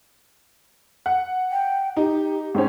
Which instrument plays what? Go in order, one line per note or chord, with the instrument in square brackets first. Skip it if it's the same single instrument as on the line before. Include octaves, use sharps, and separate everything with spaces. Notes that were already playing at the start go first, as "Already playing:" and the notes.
[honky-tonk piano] F#5
[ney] G5
[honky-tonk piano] D#4 [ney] G4
[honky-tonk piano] G#2 C4 C#4 [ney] G5